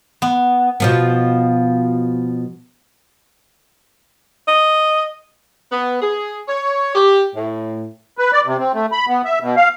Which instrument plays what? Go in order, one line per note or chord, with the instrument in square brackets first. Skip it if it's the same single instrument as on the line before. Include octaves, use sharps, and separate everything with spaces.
[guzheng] B3
[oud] B2 F3 B3
[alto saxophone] D#5
[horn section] B3
G#4
C#5
G4
A2
[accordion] B4
D5
C3
C4
A3
B5
B3
E5
B2
F5